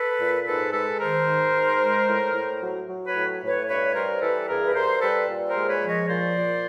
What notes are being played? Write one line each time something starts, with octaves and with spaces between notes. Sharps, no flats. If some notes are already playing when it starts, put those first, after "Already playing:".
Already playing: A4 B4
A#2
G#2 A4 B4
G#3 A4 B4
D#3 A#4 C5
G#2
G#2
G#3
A2
A2
F#3
F#3
B4 C#5
A2
A2
B4 C#5
G2 B4 C#5
G3 A#4 C5
E3 A4 B4
G2 G#4 A#4
B4
G2 A#4 C5
G3 A4 B4
A#2
A#4 C5
G#3
B4 C#5
F3
C#5 D#5
A#2 C5 D5
A#2